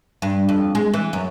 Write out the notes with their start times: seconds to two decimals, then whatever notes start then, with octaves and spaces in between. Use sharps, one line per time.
0.22 G2
0.49 F2
0.75 G#3
0.94 E3
1.13 F#2